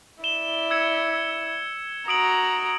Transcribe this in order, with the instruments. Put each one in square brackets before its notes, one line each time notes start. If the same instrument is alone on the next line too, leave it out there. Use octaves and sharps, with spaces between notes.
[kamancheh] E4 D5 [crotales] E7 G7
[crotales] E6 G#6 C#7
[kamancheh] F#4 A#5 [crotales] D#6 D7 F#7